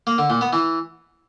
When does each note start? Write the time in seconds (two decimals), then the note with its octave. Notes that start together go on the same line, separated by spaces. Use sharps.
0.07 A#3
0.18 D3
0.30 A#2
0.41 B3
0.53 E3